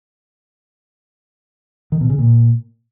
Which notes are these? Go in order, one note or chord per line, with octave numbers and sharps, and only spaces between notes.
D#3
B2
C#3
A#2